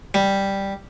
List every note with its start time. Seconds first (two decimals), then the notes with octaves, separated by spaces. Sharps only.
0.14 G3